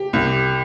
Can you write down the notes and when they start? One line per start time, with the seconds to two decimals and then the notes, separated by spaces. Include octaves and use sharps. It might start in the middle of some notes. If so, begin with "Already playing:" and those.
Already playing: G4
0.13 C2